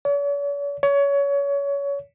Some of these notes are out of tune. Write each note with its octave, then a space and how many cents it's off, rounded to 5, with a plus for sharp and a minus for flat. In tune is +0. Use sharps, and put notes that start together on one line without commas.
C#5 +45
C#5 +25